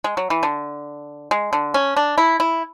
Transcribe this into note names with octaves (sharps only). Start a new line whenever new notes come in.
G#3
F#3
E3
D3
G#3
D3
C#4
D4
E4
E4